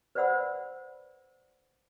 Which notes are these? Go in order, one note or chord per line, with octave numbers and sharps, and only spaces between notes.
B4 C5 D5 F#5 B5 E6